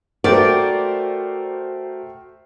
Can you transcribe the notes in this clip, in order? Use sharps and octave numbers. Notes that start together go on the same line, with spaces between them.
A3 F#4 A#4 C5 D5 G5